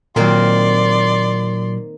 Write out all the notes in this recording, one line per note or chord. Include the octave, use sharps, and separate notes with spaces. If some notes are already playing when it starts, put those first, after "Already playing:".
A#2 D#3 F#3 A#3 C4 D5 C6